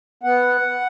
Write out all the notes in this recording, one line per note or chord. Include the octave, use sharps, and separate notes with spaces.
B3 F#5